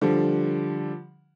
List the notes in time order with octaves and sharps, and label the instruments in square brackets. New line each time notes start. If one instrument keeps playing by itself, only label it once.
[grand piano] D3 F3 G3